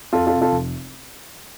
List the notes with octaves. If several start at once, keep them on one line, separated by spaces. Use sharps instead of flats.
F2 F4 A4
C3 F4 A4
F4 A4
F1